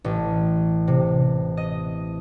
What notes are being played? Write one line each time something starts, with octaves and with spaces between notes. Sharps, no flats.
A1
C3
D#5